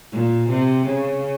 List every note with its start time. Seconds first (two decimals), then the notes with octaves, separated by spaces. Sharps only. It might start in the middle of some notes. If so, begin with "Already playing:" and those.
0.12 A#2
0.49 C3
0.86 C#3